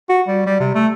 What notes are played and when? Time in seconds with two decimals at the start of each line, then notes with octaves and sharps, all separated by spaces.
0.09 F#4
0.28 G3
0.46 G3
0.60 C3
0.75 A3